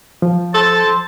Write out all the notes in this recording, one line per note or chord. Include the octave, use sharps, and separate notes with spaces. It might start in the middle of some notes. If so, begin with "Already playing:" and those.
F3
A4 C5 A5